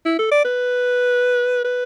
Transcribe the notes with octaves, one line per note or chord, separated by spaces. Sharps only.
E4
A4
D5
B4
B4